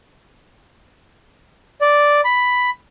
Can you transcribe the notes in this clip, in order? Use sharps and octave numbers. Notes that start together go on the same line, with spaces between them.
D5
B5